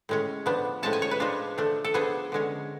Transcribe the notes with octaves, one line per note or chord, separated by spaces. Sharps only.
A2 G#3 C#4
F3 B3 D4
A2 F3 G#3 C#4 A5
G#5
C#5
B4
F3 G#3 D4 F4
F3 A3 D4
A4
F3 B3 D4 G#4
D3 G#3 C#4